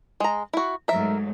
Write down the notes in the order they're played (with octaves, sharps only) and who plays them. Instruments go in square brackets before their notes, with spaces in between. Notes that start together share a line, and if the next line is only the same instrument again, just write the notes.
[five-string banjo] G#3 A#5
E4 F#4
[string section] G#2 F#3 A3 [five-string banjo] A#4 E5